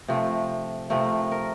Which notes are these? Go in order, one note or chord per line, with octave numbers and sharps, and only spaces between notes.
C3 F3 A3
C3 F3 A3 A#4
A#4